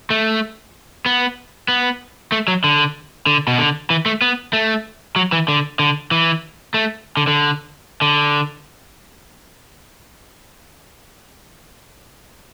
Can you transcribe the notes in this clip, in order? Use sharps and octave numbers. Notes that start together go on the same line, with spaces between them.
A3
B3
B3
A3
F#3
D3
D3
B2
D3
E3
A3
B3
A3
F#3
E3
D3
D3
E3
A3
D3
D3
D3